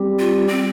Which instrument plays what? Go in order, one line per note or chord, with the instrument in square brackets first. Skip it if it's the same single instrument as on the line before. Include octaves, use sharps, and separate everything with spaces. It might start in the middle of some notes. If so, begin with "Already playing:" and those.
Already playing: [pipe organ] G3 C4 G4
[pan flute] F4
C4